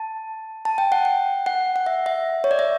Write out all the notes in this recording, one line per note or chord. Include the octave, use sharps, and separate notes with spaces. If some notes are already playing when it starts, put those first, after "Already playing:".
Already playing: A5
A5
G5
F#5
G5
F#5
F#5
E5
E5
C#5
D5
E5